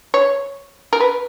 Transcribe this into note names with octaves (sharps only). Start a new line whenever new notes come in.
C#5
A#4
B4